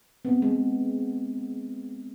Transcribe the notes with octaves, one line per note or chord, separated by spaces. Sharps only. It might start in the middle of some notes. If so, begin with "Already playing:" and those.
B3 C4
G#3